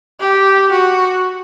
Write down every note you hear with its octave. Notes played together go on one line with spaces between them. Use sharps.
G4
F#4